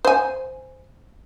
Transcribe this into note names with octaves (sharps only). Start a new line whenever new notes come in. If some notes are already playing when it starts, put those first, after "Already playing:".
C5 G#5